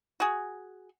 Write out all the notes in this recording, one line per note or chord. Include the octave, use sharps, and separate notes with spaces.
F#4 G#4